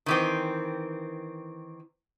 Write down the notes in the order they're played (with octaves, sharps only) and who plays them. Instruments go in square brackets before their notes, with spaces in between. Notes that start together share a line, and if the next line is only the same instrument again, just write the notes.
[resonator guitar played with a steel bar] D#3 E3 C4